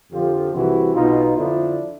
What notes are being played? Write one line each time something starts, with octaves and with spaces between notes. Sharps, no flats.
F2 D3 F3 F4 G4
C2 C3 E3 E4 F#4
B1 B2 D#4 F4
F2 D3 F3 D4 E4